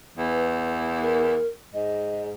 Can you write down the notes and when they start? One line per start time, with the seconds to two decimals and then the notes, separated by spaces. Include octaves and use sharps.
0.17 E2 B4
1.01 A#4
1.73 G#2 D#5